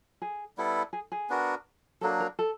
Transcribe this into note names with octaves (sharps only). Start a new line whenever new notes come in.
G#4
G3 B3 E4 A4
G#4
G#4
B3 D4 F#4 A#4
F#3 A#3 D4 A4
A#4
A4